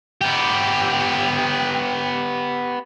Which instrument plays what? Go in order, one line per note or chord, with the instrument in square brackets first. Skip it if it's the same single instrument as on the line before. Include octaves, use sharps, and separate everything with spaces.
[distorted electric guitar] B3 G4